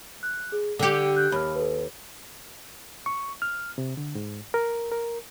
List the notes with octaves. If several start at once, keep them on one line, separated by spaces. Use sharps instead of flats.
F#6
G#4
D3 G4 A4 G5 C#7
F#6 G6
D#2 B5 F6
A4 B4
C#6
F6
C3
D3
G#2
A#4
A#4